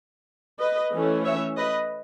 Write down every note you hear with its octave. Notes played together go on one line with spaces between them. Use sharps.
B4 D#5
E3 A3 C#4
C#5 E5
B4 D#5